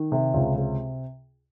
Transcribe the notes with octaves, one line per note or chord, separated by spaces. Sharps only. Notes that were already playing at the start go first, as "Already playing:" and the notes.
Already playing: D#3
C3
C#2
C3